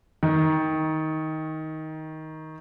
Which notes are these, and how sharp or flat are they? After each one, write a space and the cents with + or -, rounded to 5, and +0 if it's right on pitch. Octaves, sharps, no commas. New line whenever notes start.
D#3 +15